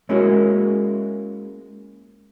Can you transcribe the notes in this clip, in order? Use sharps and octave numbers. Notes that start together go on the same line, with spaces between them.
G#3 A#3 C#4 E4 F#4 G#4